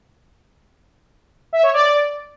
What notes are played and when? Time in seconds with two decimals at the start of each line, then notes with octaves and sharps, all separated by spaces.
1.53 E5
1.63 C#5
1.73 D5